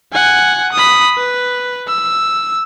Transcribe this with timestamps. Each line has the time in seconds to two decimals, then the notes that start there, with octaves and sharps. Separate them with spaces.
0.13 F#5 G#5
0.73 B5 D#6
1.18 B4
1.88 E6